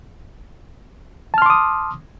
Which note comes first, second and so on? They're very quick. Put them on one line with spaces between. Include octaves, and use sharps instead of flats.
A5 F6 C6 D6 D#6